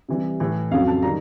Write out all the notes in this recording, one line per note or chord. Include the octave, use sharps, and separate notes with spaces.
C3 E3 G3
A2 E3 A3
F2 C#3 F#3 F5
A5
D#3 G3 A#5